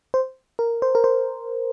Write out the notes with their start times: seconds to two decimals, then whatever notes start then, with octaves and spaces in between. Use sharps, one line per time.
0.14 C5
0.59 A#4
0.82 C5
0.95 A#4
1.04 C5